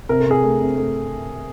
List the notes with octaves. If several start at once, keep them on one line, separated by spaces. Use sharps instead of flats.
C3 A#4
A4
C3 G#4 A#4
A3
C3
A3